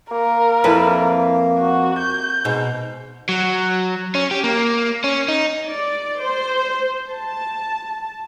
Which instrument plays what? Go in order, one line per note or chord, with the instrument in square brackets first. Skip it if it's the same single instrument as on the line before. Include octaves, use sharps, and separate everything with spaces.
[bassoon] A#3 [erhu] A#4
[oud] F2 [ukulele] E4 A4 B4
[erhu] F#4
G6
[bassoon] G#2 [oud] B2
[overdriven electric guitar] F#3
C#4
G4
A#3
C#4
D#4
[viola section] D5
C5
A5